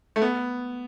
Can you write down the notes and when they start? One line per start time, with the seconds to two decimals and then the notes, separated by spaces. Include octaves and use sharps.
0.16 A3
0.22 B3